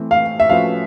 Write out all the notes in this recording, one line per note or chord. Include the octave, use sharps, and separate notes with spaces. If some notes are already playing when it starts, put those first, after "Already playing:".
Already playing: E3 A3 C4
F5
E5
F3 A3 C#4 F#4 B4 F5